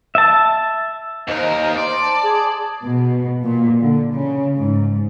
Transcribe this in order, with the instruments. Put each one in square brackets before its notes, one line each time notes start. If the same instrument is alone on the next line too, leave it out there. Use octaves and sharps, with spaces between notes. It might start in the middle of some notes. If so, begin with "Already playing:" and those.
[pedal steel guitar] E5 A5
[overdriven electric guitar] D#2 A#4 [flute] C5 [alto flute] D#5
[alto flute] C5 [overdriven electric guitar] D5 [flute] C6
[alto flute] A5
[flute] G#4
[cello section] B2
A#2
D3
C#3
G#2